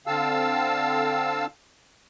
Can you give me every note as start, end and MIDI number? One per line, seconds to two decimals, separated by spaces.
0.07 1.46 50
0.07 1.46 60
0.07 1.46 77
0.07 1.46 81
0.07 1.46 88